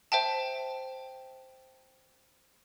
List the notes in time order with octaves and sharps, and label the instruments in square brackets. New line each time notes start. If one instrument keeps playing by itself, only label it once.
[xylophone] C5 E5 G5 A5